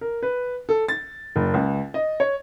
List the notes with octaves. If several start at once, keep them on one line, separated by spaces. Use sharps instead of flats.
A#4
B4
A4
A6
F#1
C#2
D#5
C#5